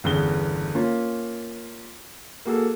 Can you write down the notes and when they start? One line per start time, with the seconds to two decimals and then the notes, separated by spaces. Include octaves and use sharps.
0.04 G1 E2 C#3 G7
0.74 A#3 C#4 F4
2.45 A#3 F#4 G#4 A4